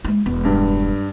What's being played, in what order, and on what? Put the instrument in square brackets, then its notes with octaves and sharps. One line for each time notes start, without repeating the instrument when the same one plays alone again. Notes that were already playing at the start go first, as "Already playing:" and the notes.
[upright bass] G#3 E4
[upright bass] E1 [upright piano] B3
[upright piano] G2